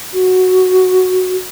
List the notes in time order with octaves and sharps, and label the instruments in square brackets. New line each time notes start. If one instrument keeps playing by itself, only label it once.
[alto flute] F#4